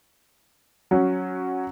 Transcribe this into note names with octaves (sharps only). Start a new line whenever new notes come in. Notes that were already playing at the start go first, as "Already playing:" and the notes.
F#3 C#4